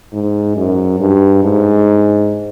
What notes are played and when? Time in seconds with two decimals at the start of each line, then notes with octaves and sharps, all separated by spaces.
0.13 G#2
0.56 F#2
1.00 G2
1.43 G#2